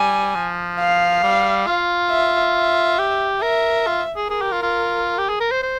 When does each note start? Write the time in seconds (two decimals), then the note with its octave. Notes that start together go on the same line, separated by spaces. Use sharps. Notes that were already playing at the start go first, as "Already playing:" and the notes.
Already playing: G3 G#5
0.35 F3
0.79 F5
1.23 G3
1.67 F4
2.11 E5
2.55 E5
2.98 G4
3.42 A#4 E5
3.86 F4
4.16 G#4
4.30 G#4 A#4
4.42 G4
4.52 F4
4.63 F4
5.18 G4
5.29 G#4
5.40 A#4
5.51 C5
5.62 C5